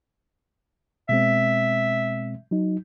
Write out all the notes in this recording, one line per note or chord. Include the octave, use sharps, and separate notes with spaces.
B2 G#3 C4 E5
F#3 D#4